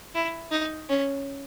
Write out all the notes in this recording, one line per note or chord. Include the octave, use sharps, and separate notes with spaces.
E4
D#4
C#4